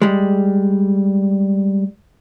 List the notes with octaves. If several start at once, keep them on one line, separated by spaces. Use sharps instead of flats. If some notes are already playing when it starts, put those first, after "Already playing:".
G3 G#3